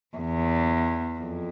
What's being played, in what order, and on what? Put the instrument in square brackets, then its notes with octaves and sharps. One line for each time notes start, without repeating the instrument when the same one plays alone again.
[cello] E2
F2